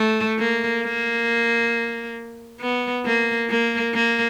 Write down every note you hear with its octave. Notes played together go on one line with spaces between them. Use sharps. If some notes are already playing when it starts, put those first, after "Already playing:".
Already playing: A3
A#3
A#3
B3
A#3
A#3
A#3